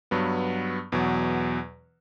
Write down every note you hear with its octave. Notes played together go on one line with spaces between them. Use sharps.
G2 F#3 B3
E2 B2 F#3